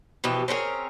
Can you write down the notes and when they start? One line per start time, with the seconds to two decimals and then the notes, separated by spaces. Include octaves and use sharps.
0.24 B2 E3 F3 G4
0.48 C4 C#4 G#4 A#4